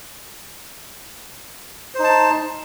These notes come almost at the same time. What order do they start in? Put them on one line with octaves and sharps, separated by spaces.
C5 D#4 A5